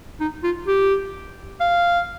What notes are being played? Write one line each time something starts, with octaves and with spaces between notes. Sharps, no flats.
D#4
F4
G4
F5